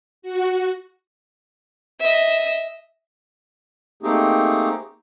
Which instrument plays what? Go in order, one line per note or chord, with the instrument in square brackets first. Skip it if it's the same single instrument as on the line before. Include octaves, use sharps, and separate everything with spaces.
[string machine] F#4
[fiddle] D#5 E5
[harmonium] A3 A#3 C4 D#4 G4 G#4